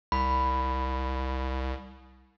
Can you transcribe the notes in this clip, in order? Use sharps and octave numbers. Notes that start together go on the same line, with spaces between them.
C2 B5